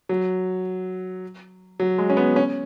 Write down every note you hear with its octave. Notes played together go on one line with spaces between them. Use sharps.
F#3
F#3
G#3
C#4
B3
C#4